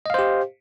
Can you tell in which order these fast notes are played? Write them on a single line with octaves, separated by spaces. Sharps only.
D#5 F5 C5 G4